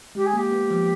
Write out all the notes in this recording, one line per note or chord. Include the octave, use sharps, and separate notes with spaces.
G#3 G4
G#4
A#3 G4
B3
F3